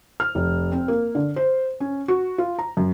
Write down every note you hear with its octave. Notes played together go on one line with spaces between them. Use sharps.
F6
F1
C4
A#3
D3
C5
C#4
F#4
F4
A#5
F#2